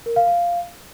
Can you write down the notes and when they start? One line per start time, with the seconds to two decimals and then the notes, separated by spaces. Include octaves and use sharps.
0.06 A#4
0.16 F5
0.27 F5